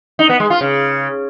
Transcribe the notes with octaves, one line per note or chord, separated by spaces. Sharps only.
D#4
B3
G#3
F4
C#3